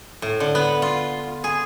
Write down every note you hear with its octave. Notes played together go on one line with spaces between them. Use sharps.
A2
D3
B3
F4
G#4